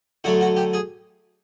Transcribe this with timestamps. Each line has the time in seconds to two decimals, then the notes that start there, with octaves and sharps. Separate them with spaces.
0.24 D3 F#3 A3 F#4
0.41 F#4
0.57 G4
0.73 G#4